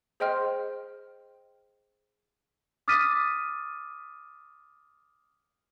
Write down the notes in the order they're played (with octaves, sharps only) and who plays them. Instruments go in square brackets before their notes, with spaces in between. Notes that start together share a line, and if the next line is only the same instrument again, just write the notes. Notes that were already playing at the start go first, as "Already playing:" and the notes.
[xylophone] G#4 C5 D#5 G5 C6 F6
[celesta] D6 D#6 F6 A6 B6 D#7